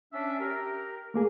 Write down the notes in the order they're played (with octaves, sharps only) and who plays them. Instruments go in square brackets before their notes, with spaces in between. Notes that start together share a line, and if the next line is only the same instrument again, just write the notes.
[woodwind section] C#4 D4 E5
G4 A#4
[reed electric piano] A3 A#3 G#4